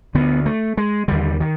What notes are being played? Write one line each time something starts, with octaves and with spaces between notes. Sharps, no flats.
D2 D3 B3
A3
G#3
D#2 D3 G3
D#3